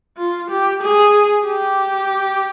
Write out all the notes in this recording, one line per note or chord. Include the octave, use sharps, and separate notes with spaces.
F4
G4
G#4
G4